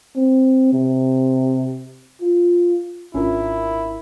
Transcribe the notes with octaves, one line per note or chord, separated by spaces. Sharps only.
C4
C3
F4
G#1 C#4 D4 E4 F4 A#4